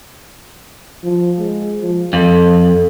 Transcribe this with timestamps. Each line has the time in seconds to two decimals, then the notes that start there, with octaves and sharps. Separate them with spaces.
1.04 F3
1.39 G#3
1.81 F3
2.13 F2 A4